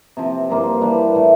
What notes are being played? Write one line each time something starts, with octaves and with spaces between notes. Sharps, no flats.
C3 F3 C4
G2 F3 A#3 F4
E3 G3 A#3 D4
A2 E3 A3